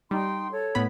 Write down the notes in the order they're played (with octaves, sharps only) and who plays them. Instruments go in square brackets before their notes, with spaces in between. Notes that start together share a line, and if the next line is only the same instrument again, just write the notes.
[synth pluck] G3 [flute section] D#4 G5 C6
[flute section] A4 C#5
[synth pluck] A2 B3 B5